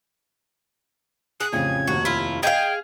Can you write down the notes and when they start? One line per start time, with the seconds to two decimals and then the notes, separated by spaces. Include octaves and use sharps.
1.40 G#4 F#6
1.53 A1 F2 C#3 G#6
1.87 F1 D#2 F#4
2.05 E4 F4
2.43 G#4 D#5 F5 G5 G#6